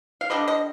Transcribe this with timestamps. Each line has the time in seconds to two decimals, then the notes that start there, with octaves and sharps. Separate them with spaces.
0.21 F5
0.30 D3 G3 D4 D#5
0.48 D#5